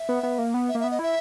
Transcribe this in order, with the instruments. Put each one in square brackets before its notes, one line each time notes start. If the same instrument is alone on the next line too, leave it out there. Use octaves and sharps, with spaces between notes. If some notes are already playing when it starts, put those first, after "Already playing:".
Already playing: [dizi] E5
[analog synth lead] B3
B3
A#3
B3
[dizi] E5
[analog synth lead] A#3
[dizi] E5
[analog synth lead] B3
[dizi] D#5
[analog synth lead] E4 [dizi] E5